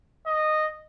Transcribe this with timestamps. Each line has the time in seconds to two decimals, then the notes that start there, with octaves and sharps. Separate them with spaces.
0.26 D#5